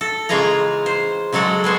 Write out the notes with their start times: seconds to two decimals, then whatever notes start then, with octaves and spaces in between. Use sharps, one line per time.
0.01 A4
0.29 C#3 E3 G#3 F4 G#4 A#5
0.86 C5
1.33 C#3 F#3 G#3 A4 F#5
1.64 G#3 B3 C5 C#5